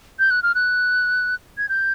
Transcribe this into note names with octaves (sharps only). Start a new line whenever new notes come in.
G6
F#6
F6
F#6
G#6
G6